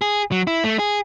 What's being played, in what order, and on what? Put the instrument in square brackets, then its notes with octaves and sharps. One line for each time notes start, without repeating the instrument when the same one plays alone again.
[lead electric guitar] G#4
F#3
E4
A3
G#4